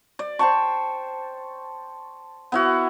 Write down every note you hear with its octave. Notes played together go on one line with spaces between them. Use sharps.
D5
C5 G5 A5 C#6
B3 E4 F#4